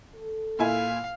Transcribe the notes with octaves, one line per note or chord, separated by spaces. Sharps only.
A4
A#2 E4 F5 G#5